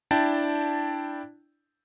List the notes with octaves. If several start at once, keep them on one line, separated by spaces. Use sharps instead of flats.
D4 E4 D5 G5 A5